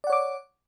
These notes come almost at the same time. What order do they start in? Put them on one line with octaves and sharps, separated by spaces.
D5 F#5 C#5 D6